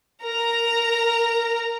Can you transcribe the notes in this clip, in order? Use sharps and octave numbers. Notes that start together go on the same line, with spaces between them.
A#4 A#5